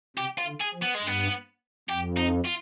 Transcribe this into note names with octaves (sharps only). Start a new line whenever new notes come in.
C3 G4
F4
D3
G#4
F3
B3
G#3
G2 B3
F2 G4
D#4
F4